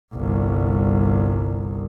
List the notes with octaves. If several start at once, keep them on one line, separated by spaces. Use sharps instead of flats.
G1 C2